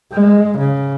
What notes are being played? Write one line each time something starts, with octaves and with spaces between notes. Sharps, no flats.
G#3
C#3